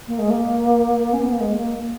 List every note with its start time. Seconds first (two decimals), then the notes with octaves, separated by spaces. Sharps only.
0.08 A#3
0.19 G#3
0.30 A#3
1.13 C#4
1.22 B3
1.32 A#3
1.40 G#3
1.57 A#3